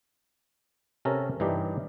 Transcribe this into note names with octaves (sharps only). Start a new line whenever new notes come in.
C3 C#4 A4 A#4 A#5
G2 E3 D4 D#4 G4